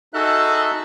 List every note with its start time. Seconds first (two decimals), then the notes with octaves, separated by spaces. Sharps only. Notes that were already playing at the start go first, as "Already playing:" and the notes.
0.14 D#4 F#4 G#4 A4 E5 F#6